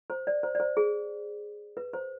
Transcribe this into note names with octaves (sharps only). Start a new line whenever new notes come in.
C5
D5
C5
D5
C5
G#4
B4
C5